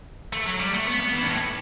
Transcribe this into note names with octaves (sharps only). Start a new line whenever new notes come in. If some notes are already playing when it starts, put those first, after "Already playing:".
A3
F#3
G3
A3
B3
B3
E3
G2
A2